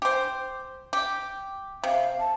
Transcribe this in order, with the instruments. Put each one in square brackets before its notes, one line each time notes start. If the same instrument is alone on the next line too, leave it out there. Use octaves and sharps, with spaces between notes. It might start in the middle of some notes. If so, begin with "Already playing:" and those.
[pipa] G4 C5
G4
[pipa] C3 [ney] F5
[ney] A5